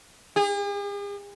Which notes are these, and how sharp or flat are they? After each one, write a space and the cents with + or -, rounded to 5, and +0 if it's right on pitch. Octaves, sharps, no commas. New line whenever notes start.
G#4 -45